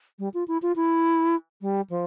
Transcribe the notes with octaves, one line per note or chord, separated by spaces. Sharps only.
G3
F4
E4
F4
E4
G3
F3